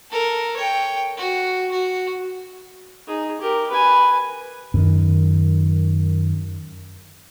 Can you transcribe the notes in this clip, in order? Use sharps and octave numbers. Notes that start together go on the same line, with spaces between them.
A4 A#4
C#5 G5
F#4
F#4
D#4 G#4
G4 A#4
B4 G#5
F#2 D#3